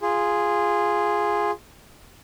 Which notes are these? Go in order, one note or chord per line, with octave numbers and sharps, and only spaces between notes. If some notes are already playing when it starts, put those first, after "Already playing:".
F4 G#4